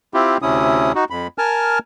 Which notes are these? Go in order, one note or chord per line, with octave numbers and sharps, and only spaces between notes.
C4 E4 F4 G4
D2 C3 C#4 E4 D#6
D#4 F#4
F2 B5
A#4 G#5 A5 F6